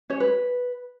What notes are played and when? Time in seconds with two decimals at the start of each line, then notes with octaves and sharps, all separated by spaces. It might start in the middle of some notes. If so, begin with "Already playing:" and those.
0.10 C#4 C#5
0.20 B4